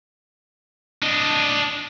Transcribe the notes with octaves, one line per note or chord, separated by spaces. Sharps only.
D4 D#5